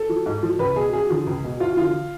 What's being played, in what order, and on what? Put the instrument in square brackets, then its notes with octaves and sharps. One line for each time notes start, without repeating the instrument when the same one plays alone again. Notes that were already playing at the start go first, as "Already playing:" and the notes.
Already playing: [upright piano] A4
F3
G#2
F3
C#2 B4
B2 G#4
F#2 G#4
D3 F3
C#2
B2
D2 F4
D3 F3 F4